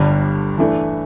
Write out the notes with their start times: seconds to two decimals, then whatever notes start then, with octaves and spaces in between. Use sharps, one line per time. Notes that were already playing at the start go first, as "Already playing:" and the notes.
Already playing: G1 G2 D3 G3 D4
0.58 E3 A3 D4